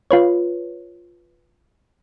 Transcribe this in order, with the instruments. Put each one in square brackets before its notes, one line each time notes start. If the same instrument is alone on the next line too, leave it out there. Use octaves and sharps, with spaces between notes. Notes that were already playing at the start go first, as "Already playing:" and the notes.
[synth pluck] F4 B4 C#5